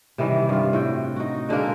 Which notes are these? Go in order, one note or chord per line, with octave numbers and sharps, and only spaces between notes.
C3 D#3 E3 G3
G2 F4
A2 F#4 G5
D#4 F#4
B2 D3 G#3 A#3